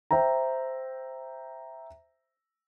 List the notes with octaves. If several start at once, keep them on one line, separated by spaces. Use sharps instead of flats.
C5 E5 G5 A#5